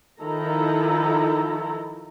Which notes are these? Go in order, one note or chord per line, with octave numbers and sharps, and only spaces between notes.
D#3 F3 E4 A4 A#5